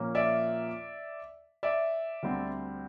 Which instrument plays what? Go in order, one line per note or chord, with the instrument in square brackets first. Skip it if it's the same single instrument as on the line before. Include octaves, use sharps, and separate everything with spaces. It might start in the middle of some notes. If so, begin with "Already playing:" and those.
Already playing: [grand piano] A#2 F3 A#3 C#4
D5 E5
D5 E5
D2 D3 G3 C4